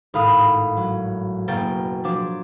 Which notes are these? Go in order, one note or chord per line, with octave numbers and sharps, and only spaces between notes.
G#1 A2 F5 B5 D#6
F#3
F#1 B2 A#3 G5 A6 D7
F3 F#3 D4 D6